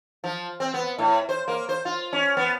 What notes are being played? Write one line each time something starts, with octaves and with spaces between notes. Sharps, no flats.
F3
C4
B3
A2
C5
A#3
C5
F4
C#4
B3